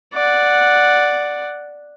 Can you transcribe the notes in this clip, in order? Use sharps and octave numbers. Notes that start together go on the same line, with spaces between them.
D5 F#5